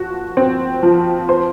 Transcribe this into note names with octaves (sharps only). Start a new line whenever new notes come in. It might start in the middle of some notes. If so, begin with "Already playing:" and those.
Already playing: F3 F#4
C4
F3
C5